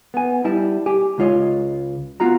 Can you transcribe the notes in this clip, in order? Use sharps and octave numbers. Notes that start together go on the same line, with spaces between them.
B3 G#5
G3 E4 E5 A5
G4 G#5
C#2 G#3 F4 C#5 D#5
B3 F4 F#4 A#5